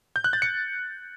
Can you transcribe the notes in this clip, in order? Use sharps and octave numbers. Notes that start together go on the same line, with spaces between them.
G6
F#6
A6
C#7